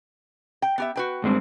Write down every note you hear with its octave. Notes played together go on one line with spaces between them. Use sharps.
G5
B3 G4 E5
F#4 B4 G5
G2 G#3 C4